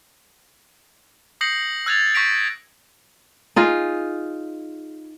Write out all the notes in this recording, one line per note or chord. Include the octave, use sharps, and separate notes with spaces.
D#6 G6 A#6 C7 C#7 F#7
E6 F#6 G#6 A6 F7
C#6 G6 A#6 B6 D7 F7
D#4 F4 G#4